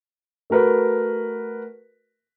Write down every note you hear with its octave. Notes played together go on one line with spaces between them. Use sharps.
A3 F#4 A#4 B4